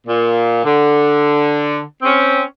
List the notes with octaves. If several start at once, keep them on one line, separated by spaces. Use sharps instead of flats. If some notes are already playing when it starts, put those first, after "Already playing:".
A#2
D3
C4 C#4